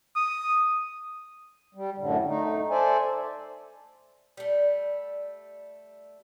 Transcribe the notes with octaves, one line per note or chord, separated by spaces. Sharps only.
D#6
G3
F#2 A2 D3
A3 D#4
A4 C5 D5 E5 G#5
G3 A3